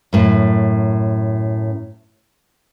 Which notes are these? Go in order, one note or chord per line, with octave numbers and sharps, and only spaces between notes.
F#2 A2